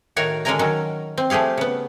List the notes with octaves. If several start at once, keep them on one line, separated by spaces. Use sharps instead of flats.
A2 D#3 F#4 A#4 C#5 F5
D3 G#3 C#4 A#4 G#5 A#5
D#3 F#3 C#4
C4
F3 A3 G4 G#4 F5
C#3 B3